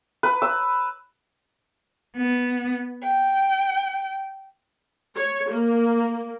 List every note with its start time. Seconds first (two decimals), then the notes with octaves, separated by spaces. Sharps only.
0.23 B4
0.42 E6
2.18 B3
3.04 G5
5.16 C#5
5.51 A#3